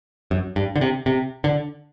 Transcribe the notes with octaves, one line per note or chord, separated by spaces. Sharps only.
F#2
G2
D3
C3
C3
D3